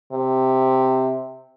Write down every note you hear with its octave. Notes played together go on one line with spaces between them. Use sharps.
C3